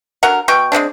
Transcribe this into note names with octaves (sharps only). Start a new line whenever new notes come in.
D3 F#3 A#4 F#5
B2 G5 C#6
G#3 B3 C4 D4